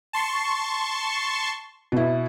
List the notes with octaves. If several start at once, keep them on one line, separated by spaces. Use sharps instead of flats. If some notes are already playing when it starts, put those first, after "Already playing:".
A5 C6 C#6
B2 E4